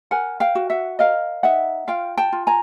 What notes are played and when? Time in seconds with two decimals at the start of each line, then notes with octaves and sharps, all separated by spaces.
0.11 A#4 F#5 G#5
0.40 F5 G5
0.55 F#4
0.70 E5 F#5
0.99 A#4 D#5 F5
1.43 D#4 E5 F#5
1.88 F4 F5 G5
2.17 G5 A5
2.32 F4
2.47 G#5 A#5